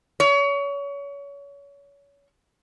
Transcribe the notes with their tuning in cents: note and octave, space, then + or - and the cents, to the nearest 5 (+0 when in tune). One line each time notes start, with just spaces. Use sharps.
C#5 +30